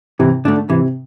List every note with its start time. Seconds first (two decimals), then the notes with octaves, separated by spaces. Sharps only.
0.19 C3 E3
0.45 D3 A3 D4
0.70 C3 E3